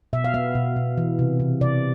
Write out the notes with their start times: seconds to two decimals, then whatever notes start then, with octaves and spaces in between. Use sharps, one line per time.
0.13 B2 E5
0.24 F5
0.34 B3 E5
0.55 B2
0.76 B2
0.98 E3
1.19 C3
1.40 C3
1.61 C3 D5